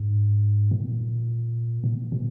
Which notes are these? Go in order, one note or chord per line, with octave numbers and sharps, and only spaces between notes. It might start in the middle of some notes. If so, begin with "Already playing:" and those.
Already playing: G#2
A#2
A#2
B2